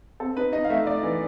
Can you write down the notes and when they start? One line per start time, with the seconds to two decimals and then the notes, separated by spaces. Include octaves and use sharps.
0.20 C4 A4
0.37 D#4 B4
0.52 D#4 D#5
0.64 F5
0.70 A3 E5
0.87 A3 D5
1.03 E3